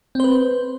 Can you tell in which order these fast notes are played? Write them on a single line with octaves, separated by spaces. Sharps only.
C4 C5 B4